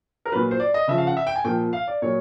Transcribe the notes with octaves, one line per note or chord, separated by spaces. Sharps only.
A#4
A#2 F#3 B4
C5
D5
D#5
C#3 F3 E5
F5
F#5
E5
G5
G#5
A#2 F3 G5
F5
D5
A#2 F#3 C#5